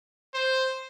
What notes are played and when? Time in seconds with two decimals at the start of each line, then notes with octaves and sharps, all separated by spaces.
0.34 C5